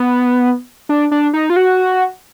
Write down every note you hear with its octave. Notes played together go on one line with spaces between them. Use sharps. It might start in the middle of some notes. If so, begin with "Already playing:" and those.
Already playing: B3
D4
D4
D#4
F4
F#4